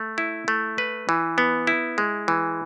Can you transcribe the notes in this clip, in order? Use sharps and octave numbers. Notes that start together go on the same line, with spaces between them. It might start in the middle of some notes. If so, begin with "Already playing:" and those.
Already playing: A3
E4
A3
B4
E3
B3
E4
G#3
E3